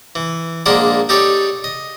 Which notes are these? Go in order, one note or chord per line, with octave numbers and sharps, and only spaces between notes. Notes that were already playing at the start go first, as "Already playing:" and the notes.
E3
A#1 G#3 A#3 D4 A#4 F#5
D#4 G4 A4 C#5 D5
D#5